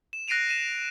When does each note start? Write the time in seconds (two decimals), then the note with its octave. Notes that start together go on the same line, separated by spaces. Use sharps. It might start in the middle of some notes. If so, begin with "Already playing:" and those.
0.13 E7
0.28 F#6 A#6 C7 D7 D#7 F7
0.49 D#7 E7